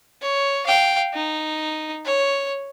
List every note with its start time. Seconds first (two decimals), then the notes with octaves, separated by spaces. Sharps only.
0.22 C#5
0.67 F5 G5
1.14 D#4
2.05 C#5